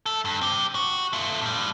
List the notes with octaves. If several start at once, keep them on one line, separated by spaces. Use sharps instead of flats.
A3 A4
G2
C4 G4
F#4
A3 F4
A2 G3